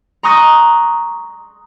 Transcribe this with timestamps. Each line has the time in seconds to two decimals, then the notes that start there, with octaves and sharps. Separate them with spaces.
0.23 A#5 C6 C#6 D#6 F#6 A#6